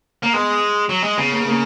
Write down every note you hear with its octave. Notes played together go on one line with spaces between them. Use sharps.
A#3
G#3 B3
F#3
G#3
C#3 B3
A#3
B3
A#3